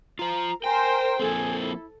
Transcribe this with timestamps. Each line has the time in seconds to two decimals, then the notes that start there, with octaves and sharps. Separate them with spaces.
0.19 F4 C5 A#5
0.64 A#4 C5 G5 G#5
1.19 F3 A#3 C4 G#4 A4
1.61 E4